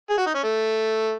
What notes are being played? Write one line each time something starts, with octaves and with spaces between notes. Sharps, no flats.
G#4
F#4
D#4
C#4
A3